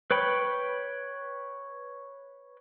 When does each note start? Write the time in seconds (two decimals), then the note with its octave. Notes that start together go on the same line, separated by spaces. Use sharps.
0.11 B4 C#5 G5 B5